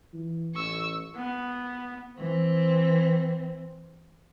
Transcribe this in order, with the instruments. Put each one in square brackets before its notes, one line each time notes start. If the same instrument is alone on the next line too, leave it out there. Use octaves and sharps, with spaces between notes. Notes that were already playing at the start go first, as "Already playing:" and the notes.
[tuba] E3
[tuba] A1 [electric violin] C#6 E6
[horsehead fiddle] B3
[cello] E3 C4